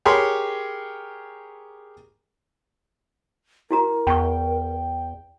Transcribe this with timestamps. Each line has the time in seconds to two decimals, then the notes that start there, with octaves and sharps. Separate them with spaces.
0.05 G4 G#4 A#4 C#5 B5 C6
3.71 E4 F#4 A#4 A#5
4.07 E2 G5 B5 C#6